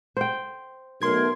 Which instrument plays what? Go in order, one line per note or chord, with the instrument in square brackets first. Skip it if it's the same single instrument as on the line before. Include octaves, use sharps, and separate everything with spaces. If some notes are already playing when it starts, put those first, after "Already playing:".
[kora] C5 G5
[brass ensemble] B1 A3 [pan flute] A#4 [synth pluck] C6 G#6